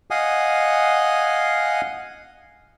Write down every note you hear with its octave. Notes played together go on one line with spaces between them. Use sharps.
D#5 F5 F#5 G#5 D#6